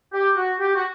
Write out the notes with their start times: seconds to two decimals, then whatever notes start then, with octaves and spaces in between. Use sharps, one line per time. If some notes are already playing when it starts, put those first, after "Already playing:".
0.14 G4
0.36 F#4
0.59 G4
0.75 F#4